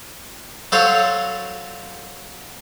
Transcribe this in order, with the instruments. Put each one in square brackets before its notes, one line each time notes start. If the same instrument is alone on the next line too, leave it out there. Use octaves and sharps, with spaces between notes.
[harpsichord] F#3 A4 C5 C#5 F5